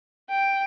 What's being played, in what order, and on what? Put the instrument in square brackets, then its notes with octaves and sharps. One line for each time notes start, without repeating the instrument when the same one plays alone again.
[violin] G5